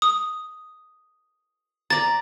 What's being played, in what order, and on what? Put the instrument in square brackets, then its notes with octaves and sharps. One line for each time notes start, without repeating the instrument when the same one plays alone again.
[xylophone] D#6
[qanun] D5 A#5 [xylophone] A6